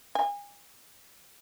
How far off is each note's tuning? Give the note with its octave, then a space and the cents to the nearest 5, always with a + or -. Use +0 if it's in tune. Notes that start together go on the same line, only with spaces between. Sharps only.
G#5 -35